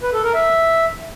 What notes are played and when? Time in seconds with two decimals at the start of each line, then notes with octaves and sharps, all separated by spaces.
0.03 B4
0.13 A4
0.24 A#4
0.34 E5